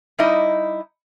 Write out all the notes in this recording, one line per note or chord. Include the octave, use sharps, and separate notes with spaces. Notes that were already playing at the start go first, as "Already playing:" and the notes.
G3 D#4 E4 D#5